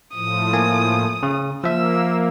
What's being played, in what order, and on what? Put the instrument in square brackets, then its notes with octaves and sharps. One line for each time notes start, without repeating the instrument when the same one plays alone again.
[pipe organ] A2 F3 [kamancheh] D#6
[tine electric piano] A#3 G#5
C#3
[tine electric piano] F3 E5 [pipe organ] A#3 [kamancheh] E6